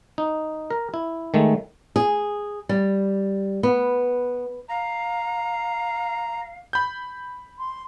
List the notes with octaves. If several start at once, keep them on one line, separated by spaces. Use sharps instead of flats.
D#4
A#4
E4
D#3 G#3 A3
G#4
G3
B3
F5 A#5
B5 G6
C6